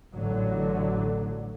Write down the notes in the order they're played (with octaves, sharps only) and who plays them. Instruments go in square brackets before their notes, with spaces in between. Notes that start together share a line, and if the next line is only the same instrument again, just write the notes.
[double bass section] A1 D3 F#3